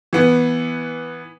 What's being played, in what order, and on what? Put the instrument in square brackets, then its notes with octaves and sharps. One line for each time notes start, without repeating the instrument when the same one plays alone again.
[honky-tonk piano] E3 B3